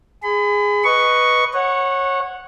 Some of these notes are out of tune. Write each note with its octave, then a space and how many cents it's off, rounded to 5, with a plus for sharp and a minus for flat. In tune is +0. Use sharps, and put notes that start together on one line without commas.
G#4 -5 B5 +40
B4 +0 D#5 +0 C#6 +0
C#5 -20 F#5 -5